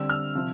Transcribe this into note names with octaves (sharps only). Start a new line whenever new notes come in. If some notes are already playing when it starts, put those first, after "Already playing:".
Already playing: D3 G3 C4 E6
F6
C3 F3